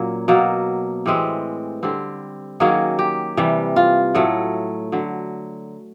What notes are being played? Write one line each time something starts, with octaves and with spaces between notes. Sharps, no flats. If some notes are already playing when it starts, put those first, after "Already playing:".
Already playing: A#2 F#3 A#3 C#4
B2 F#3 A#3
A2 E3 G#3 C4 G4
D3 G3 C4
D#3 F#3 A#3 C#4 G#4
G4
C3 E3 G3
F4
A2 F#3 A3
D3 F#3